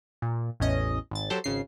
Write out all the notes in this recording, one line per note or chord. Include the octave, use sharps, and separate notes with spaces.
A#2
A1 E2 C#4 D#5
G#1 A6
F#3 G4 A4 C5
G#1 C#3 C7